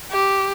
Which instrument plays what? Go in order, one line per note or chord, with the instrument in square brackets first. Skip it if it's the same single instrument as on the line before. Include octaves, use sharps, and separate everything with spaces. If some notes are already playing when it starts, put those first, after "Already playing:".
[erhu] G4